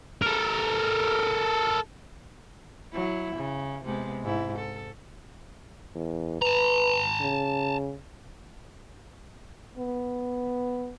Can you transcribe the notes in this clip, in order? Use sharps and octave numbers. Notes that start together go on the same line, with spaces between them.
A4 A#4
F#3 E4
C#3
C3 G#3 B3
G#2 E4
A4
E2
B4 A5 A#5
C#3
B3